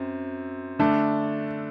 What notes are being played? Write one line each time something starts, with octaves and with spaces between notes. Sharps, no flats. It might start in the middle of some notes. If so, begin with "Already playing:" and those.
Already playing: F#2 C4
D3 A3 D4